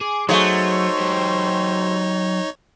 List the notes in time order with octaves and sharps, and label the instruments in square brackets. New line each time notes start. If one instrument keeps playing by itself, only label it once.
[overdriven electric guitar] G#4 [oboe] D6
[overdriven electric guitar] F#3 [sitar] A3 F#4 G#4 [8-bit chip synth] D#4 C#5 [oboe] C5
[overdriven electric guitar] F#3 G4